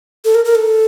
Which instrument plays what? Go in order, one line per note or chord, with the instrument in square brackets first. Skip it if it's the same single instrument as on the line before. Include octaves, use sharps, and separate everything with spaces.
[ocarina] A4
A#4
A#4
A4